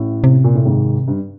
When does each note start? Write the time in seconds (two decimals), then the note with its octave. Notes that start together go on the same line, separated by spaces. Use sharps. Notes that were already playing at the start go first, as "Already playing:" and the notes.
Already playing: A1 A2
0.24 C3
0.44 A#2
0.55 A2
0.65 G#1 G#2
1.08 G2